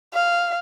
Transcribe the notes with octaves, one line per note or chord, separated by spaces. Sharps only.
F5